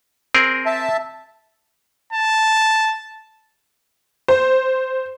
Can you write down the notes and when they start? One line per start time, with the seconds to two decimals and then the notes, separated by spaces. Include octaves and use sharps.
0.35 C4 G#4 A#4
0.66 E5 A5
2.13 A5
4.28 C5